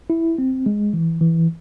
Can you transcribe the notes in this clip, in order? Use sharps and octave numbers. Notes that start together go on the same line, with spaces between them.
E4
C4
G#3
E3
E3